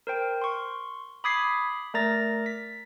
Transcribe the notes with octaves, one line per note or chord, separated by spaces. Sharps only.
A#4 C5 G5
C6 C#6
B5 D6 D#6 G#6 B6 C7
A3 A#4 D5 A#5 A6 A#6
B6